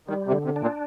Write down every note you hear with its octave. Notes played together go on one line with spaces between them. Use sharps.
D#3 G3
C3
D3
C3
D4
A#2